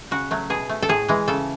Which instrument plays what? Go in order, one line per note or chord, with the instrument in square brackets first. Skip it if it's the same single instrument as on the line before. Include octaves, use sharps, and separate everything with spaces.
[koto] C#3 F#4
F#3 A3
B2 G#4
A3
A4
A2 G#4
E3 G#3
C#3 A4